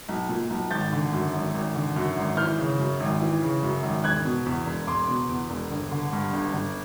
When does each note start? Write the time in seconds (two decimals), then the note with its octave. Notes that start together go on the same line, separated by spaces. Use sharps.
0.09 B1
0.29 A#2
0.50 B1
0.71 G#1 G6 A6
0.92 D3
1.13 F#2
1.34 G#1
1.55 G#1
1.75 D3
1.96 F#2
2.17 G#1
2.37 E3 F6 G6
2.59 C#3
2.80 F#2
3.00 G#1
3.22 E3
3.42 C#3
3.63 F#2
3.83 G#1
4.04 E1 F#6 G#6
4.24 B2
4.46 E2
4.66 E1
4.87 E1 C6 D6
5.08 B2
5.29 E2
5.50 E1
5.71 G1
5.92 D3
6.13 G2
6.33 G1
6.53 G1